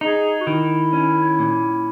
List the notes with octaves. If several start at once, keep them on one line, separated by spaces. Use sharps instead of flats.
D#4 G#4
F#4
D#3 E4
C#4
A#2